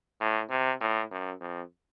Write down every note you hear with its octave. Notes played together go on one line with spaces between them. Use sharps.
A2
C3
A2
F#2
F2